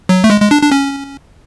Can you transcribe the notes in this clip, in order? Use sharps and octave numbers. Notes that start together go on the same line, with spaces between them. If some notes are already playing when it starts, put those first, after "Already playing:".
F#3
A3
G#3
G#3
D4
D4
C#4